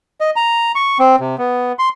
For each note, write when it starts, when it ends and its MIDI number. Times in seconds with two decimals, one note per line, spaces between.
0.21 0.30 75
0.36 0.72 82
0.75 0.98 85
0.99 1.16 60
1.20 1.36 48
1.38 1.72 59
1.79 1.89 84